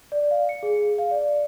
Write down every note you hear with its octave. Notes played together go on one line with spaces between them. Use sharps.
D5
F5
C#7
G#4
F5
D5